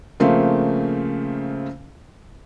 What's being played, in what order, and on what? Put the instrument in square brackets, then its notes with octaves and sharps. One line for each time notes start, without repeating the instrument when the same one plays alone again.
[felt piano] C#3 F3 A3 A#3 C4